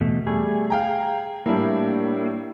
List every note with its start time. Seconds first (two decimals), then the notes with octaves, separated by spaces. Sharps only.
0.01 E2 B2 A3
0.27 G3 A3 G#4
0.70 F5 G5 A#5
1.46 A2 G3 A#3 D4 E4